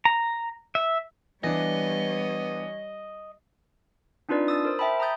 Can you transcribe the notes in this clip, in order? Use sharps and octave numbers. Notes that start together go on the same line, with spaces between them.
A#5
E5
E3 G3 B3 D4 C#5 D#5
C4 D4 D#4 F4 B4 D5
D#6 E6 A6
A#4 C5
E5 G5 A5 B5
A#5 B5 D#6 G6 A6